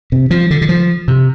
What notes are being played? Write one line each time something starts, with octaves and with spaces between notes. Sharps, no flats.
C3
F3
D3
D3
F3
C3